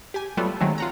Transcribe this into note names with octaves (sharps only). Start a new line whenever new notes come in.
G4 G#5
F#3 G3 A3 B3 F4 A4
D#3 F#3 G#3 A3 C4
F4 F#5 A#5